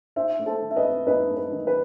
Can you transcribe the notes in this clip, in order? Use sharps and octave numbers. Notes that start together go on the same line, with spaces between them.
D#4 C5 E5
A3
A4 C5
D#3
E5
B4 D#5
C4
D#4 B4 D#5
A3
B4
D#3
B4